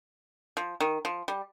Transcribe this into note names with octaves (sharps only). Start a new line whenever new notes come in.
F3
D#3
F3
G3